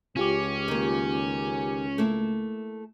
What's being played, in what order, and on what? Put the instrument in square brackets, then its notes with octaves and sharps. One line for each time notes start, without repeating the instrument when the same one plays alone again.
[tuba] C#2 [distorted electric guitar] C#4 [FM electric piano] F4 G4 D6
[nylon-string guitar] D#3 A#3
A3 A#3 E4